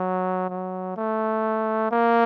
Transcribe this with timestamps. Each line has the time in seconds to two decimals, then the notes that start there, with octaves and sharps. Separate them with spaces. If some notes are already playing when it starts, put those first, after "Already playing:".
Already playing: F#3
0.49 F#3
0.97 A3
1.91 A#3